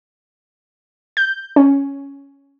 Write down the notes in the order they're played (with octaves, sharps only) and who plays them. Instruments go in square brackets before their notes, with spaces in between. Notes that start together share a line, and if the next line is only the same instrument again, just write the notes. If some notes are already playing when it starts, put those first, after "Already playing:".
[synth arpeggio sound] G6
C#4